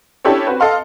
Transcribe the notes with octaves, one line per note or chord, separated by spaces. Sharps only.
C#4 D4 E4 G4 A4 C#5
C4 F#4 B4
A4 D#5 F5 C6